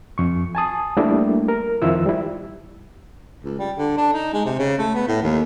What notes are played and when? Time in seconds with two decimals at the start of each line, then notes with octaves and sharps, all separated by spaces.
0.18 F2 C#6
0.55 G#5 A5 D#6
0.97 G3 A3 A#3 D4 E4
1.48 A#4
1.82 F2 D#3 F3 E4 F4 E6
2.06 G3 E4
3.44 C#2
3.59 G3
3.78 D3
3.98 D4
4.13 D#4
4.33 G#3
4.46 C3
4.59 C#3
4.79 A3
4.95 B3
5.08 A2
5.22 D#2